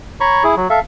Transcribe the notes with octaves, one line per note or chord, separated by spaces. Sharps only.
C#5 A#5 B5 C#6
E4 G#4
F#3
A4 E5 F5